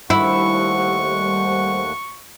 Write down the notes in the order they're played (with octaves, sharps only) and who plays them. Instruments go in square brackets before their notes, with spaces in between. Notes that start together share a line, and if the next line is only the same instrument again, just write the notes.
[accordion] D#2 A3 F#5 [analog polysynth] G3 C5 [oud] E4 [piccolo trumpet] C#6